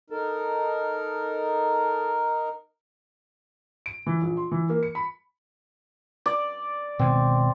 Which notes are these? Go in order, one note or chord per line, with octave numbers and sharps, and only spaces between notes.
D#4 A4 A#4
D7
E3
A#1
C6
E3
A#3
C#7
B5
D5
B2 D#3 G#3 C4